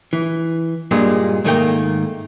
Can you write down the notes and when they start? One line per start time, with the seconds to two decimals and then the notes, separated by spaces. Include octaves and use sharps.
0.13 E3
0.91 G2 A#2 G#3 A#3
1.44 G#2 D#3 A3 A#3 A#4 G5